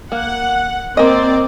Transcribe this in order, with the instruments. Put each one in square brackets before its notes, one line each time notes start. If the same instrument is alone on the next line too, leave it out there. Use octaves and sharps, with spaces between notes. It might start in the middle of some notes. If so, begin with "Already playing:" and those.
[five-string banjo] A#3 [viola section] F#5
[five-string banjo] A#3 D#5 [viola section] C4 D5